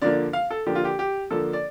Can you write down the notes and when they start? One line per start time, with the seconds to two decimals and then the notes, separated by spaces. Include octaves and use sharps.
0.02 D3 F3 A#3 D5
0.33 F5
0.51 A4
0.66 D3 F3 A#3 G4
0.75 F4
0.85 G4
0.99 G4
1.31 D3 F3 A#3 A4
1.53 D5